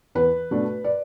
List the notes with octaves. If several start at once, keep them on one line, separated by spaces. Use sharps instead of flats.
E2 B4
B2 A3 D4
D5